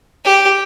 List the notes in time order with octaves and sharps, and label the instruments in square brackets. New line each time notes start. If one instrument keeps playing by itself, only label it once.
[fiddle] G4